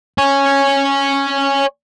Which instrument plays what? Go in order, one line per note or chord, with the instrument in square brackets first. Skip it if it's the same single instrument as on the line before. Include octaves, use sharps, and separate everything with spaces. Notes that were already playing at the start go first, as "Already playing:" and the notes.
[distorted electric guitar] C#5 G#5